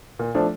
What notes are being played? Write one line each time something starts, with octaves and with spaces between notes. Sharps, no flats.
A#2
F3 A3 D4